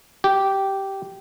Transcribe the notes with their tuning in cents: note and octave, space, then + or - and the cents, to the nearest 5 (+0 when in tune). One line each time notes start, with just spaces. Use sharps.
G4 -10